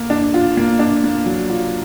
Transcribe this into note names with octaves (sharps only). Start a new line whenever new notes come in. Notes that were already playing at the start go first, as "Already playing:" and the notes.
Already playing: A#3
D4
F4
A#3
D4
A#3
F#3
F4